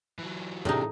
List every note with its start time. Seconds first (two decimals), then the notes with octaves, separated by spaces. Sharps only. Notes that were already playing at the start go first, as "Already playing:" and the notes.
0.18 E3 F#3
0.65 A2 C3 D4 D#4 G#4